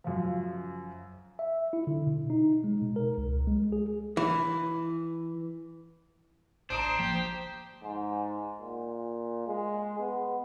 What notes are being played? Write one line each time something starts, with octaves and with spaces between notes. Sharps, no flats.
F#2 C#3 F3
E5
E4
D3
B2
D#4
G#3
B2
A#4
C#2
G#3
G#4
E3
A1 D4 C5 A#5 D#6 D7
F3 A#3 G4
G#2
A#2
G#3
B3